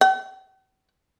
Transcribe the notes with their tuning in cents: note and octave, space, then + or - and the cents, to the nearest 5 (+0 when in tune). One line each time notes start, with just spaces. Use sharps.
G5 -45